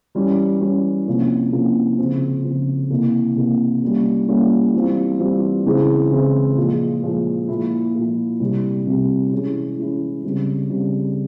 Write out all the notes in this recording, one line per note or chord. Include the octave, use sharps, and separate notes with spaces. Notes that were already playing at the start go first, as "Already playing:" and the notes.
E3 G3 C#4
E3 G3 C#4
C3 F3 A#3 C#4 E4
C3 F3 A#3 C#4 E4
C#3 F3 C4
C#3 F3 C4
C3 E3 A#3 E4
C3 E3 A#3 E4
G3 A#3 C#4 E4
G3 A#3 C#4 E4
E3 G3 C4 F4
E3 G3 C4 F4
C#3 E3 G#3 C4 E4
C#3 E3 G#3 C4 E4
A#2 F3 G#3
A#2 F3 G#3
A#2 F3 A#3 E4
A#2 F3 A#3 E4
C3 G3 C4 E4
C3 G3 C4 E4
E3 G#3 C#4 E4
E3 G#3 C#4 E4
C#3 G3 C4
C#3 G3 C4